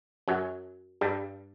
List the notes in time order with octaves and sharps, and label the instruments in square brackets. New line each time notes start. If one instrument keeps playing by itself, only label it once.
[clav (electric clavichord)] F#2 F#3
G2 G3